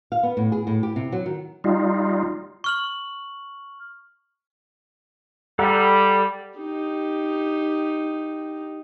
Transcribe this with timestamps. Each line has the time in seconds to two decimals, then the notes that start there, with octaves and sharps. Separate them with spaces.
0.12 F5
0.23 B3
0.37 A2
0.52 G#4
0.67 A2
0.83 G4
0.96 C3
1.12 F#3
1.26 D#3
1.64 G3 D#4 F4
2.64 C#6 F6 F#7
5.59 G3 A4 F#5 A#5
6.59 D#4 G4